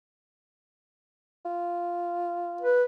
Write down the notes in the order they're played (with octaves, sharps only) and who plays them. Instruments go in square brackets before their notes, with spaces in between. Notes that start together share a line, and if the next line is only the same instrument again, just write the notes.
[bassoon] F4
[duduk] B4